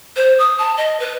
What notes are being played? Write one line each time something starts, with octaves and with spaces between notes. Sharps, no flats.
C5
D#6
A5
D#5
B4